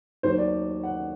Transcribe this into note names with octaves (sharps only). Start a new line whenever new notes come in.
D#2 D#3 F#3 C5
D5
F#5